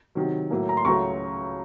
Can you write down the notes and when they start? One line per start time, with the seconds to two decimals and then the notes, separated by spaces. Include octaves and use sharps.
0.15 C3 D#3 F#3
0.50 A2 F#3 A#3
0.69 A#5
0.77 C6
0.85 C#2 C#3 F#3 A3 A#5 C#6